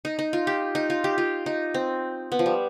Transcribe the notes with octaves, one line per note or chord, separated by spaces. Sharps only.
D#4
D#4
F4
G4
D#4
F4
G4
F4
D#4
C4
B3
F3
G3